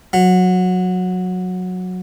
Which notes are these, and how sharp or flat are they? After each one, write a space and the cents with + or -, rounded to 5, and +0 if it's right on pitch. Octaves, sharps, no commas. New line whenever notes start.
F#3 -15